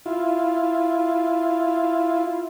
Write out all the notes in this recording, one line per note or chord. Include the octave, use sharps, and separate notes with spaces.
E4 F4